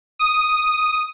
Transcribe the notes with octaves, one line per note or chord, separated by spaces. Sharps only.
D#6